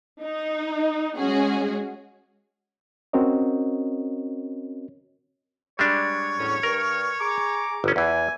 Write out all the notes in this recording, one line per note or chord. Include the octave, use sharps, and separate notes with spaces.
D#4
G#3 C#4 F#4 G#4
C4 C#4 F#4 A#4 C#5 D#5
G3 G#3 D4 C#5
E2 A2 C#4
G2 A#4 F6
G#4 A#5 D6
G1 C#4
E2 E3 G#5